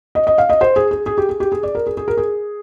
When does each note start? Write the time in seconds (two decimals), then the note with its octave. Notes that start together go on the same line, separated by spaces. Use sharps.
0.15 D#5
0.27 D#5
0.38 F5
0.50 D#5
0.61 C5
0.76 G#4
0.91 G#4
1.06 G#4
1.18 G4
1.29 G#4
1.40 G4
1.52 G#4
1.63 D5
1.75 A#4
1.87 G#4
1.97 G#4
2.08 A#4
2.17 G#4